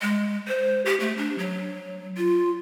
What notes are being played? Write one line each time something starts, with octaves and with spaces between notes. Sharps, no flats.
G#3
C5
G4
A3
D4
F#3
F4